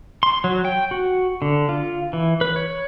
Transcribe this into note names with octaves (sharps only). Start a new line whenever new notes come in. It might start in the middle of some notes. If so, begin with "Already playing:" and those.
C6
F#3
G5
F#4
D3
F4
E3
B4
C#5